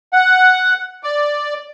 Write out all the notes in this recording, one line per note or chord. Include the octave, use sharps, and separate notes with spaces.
F#5
D5